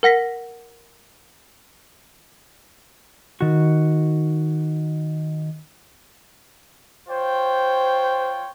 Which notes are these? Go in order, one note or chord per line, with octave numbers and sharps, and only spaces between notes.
A#4 F#5 A#6 B6
D#3 F#4
F4 C5 C#5 G5